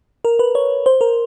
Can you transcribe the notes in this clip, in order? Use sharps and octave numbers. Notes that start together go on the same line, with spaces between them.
A#4
B4
C#5
C5
A#4